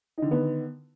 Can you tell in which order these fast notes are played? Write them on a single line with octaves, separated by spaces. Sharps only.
D#4 D3 D#3 B3